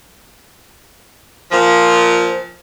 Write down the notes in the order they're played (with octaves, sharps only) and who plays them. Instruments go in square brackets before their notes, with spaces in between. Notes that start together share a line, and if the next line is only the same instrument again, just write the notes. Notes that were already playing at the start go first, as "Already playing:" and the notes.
[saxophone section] A#2 F3